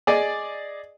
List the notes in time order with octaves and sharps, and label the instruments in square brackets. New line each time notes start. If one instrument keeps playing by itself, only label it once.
[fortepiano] G#4 D5 D#5